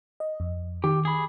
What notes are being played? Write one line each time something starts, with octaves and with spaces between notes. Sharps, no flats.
D#5
F2
D#3 G4
G#4 B5